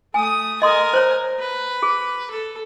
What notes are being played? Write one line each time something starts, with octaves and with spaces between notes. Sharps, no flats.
A3 G#5 D#6
A#4 D#5 G#5 C6 D#6
C5 C#5 A#5
B4
G#4
A4